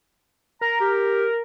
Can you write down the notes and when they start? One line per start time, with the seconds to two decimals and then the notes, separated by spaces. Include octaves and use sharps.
0.61 A#4 A#5
0.80 G4